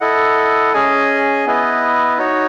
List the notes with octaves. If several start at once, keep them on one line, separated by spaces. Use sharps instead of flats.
E4 A4 D#5 F#5
C#4 G#4 D#5 G#5
B3 E4 B4 D#5
D#4 F#4 C#5